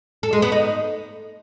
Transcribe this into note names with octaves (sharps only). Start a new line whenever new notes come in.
A4
G#3
B3
D#4